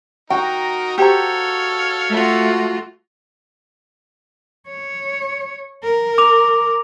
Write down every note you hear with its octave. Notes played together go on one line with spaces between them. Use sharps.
D#4 F#4 A#4 G5
G4 A4 C5 C#5 F5 A#5
A3 F4 F#4
C#5
A#4
D6 F7